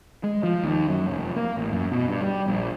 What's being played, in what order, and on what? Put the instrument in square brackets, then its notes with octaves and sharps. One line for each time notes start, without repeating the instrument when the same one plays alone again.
[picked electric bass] G#3
F3
D#2
F#2
F1
A#3
A1
F#2
B2
G2
G3
A#1